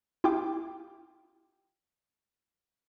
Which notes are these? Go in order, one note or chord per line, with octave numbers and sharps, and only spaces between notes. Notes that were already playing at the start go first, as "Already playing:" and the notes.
E4 F4 G4 F5 G5 D6